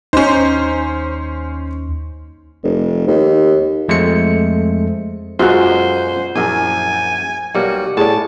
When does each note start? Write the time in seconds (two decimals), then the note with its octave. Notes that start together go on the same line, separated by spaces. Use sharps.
0.13 D#2 C#4 D#4 C5
2.64 F1
3.07 D#2
3.88 F2 G#3 A3 C5 C#7
5.39 F#2 B2 G#3 F4 F#4 C5
6.36 A#1 F#2 E4 G#5
7.55 B1 G3 A#3 F#4
7.97 A2 G#4 D5 A5